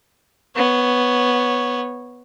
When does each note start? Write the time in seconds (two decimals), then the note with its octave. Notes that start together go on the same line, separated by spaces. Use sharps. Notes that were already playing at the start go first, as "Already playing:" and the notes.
0.56 B3 C#5